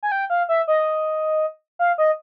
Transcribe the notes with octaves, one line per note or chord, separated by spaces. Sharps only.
G#5
G5
F5
E5
D#5
F5
D#5